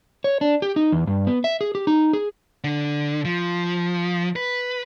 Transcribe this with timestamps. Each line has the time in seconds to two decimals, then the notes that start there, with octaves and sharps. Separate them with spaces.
0.24 C#5
0.41 D4
0.62 G4
0.76 D#4
0.92 E2
1.07 G2
1.27 B3
1.44 E5
1.61 G#4
1.75 G4
1.87 D#4
2.13 G#4
2.64 D3
3.25 F3
4.36 B4